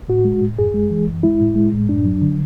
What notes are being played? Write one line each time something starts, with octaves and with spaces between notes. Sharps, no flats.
A2 F#4
G#3
A2
F#2 G#4
G#3
E3
F#2
G#3 E4
A2
G#3
A2
F#2 D4
F#3
D3